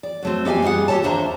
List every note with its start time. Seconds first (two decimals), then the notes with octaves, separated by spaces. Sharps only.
0.03 D5
0.23 F#3 A3 C4
0.45 B3 G4 E5 F5 G#5
0.62 G2 G3 F4 G#4 F#5
0.88 G4 A4 C#5 A5
1.03 D#2 A#3 D4 C5 E5 A#5